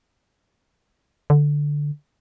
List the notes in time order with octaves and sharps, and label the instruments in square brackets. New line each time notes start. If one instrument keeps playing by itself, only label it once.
[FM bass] D3